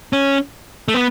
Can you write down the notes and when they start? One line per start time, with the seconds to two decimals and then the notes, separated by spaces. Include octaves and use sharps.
0.13 C#4
0.88 A3
0.94 B3